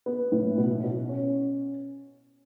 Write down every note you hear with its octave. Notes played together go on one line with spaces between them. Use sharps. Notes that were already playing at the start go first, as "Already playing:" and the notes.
B3
A2
B2
B2
C#4